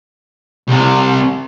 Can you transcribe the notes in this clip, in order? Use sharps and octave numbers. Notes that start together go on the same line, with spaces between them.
C2 C3